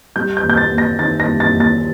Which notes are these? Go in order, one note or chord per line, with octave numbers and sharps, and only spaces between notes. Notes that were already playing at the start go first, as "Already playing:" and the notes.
G3 G6
G6
D#2
G6
A6
D#2
A#6
D#3 A6
A#6
G3
A6
D#2
A6